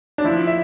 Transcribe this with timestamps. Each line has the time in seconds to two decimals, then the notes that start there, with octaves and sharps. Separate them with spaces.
0.18 D4
0.24 F3 E4
0.47 E5